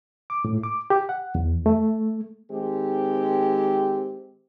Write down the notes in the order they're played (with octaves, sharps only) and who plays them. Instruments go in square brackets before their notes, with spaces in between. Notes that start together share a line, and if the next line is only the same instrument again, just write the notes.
[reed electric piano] D6
A2
D6
G4
F#5
E2
A3
[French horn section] D#3 G#3 C4 G4